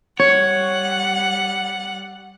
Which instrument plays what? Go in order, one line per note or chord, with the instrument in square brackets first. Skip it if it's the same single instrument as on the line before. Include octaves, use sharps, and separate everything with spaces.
[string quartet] G3 F#5 [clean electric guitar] C#5